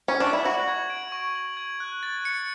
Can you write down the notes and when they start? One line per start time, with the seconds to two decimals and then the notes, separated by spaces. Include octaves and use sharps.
0.08 C#4
0.20 D4
0.33 E4
0.44 F#4 F#7
0.68 G#6
0.90 D7
1.12 C#6
1.35 F#7
1.57 G#6
1.80 F#6
2.03 A6
2.25 C#7